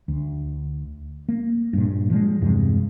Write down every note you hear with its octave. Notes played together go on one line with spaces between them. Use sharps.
D2
A#3
G2 A#2
F3 G#3
E2 G2 C3 G#3